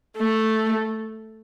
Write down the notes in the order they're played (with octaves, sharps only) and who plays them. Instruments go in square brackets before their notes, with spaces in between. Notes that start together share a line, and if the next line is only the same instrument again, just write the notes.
[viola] A3